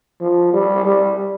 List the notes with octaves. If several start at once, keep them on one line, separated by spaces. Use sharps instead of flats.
F3
G3
G3